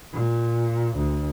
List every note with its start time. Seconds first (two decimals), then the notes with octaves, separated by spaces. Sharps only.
0.13 A#2
0.96 D2